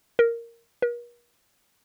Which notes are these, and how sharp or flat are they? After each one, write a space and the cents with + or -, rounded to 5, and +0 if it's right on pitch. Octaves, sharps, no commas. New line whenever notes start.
A#4 -5
A#4 +45